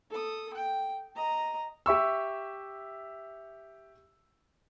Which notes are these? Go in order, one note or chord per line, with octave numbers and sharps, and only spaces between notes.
A4 D#6
G5
D#5 A#5
G4 E5 C#6 E6